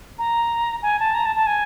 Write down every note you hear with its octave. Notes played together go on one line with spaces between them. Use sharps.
A#5
G#5
A5
A#5
A5
A5
G#5